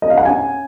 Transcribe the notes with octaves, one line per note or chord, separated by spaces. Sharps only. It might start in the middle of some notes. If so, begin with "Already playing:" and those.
D#5
F5
F#5
C#4 G#5